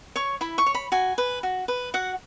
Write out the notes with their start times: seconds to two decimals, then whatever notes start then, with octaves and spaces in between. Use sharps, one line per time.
0.16 C#5 C#6
0.41 E4 B5
0.58 C#6
0.66 C#5
0.75 B5
0.92 F#4 G#5
1.18 B4
1.43 F#4
1.68 B4
1.94 F#4 F#5